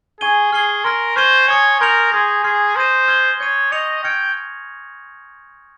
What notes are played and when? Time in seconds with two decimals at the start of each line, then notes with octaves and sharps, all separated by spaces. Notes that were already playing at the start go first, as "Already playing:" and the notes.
0.20 G#4 G#5 C#6 G#6 D#7 G7
0.52 G#4 F6 C7 G7
0.84 A#4 C6 F6 A#6
1.16 C5 C#6 G#6 C7 D#7 G7
1.48 C#5 G#5 D#6 G#6 C#7
1.80 A#4 C6 G6 C#7 F7
2.12 G#4 C6 D#6 A#6
2.44 G#4 C6 F6 C7
2.76 C5 C6 D#6 A#6 D#7
3.08 F6 G#6 C7 G7
3.40 C#5 G6 C7 D#7
3.72 D#5 C#6 G6 A#6 C#7 F7
4.03 G5 F6 G#6 C#7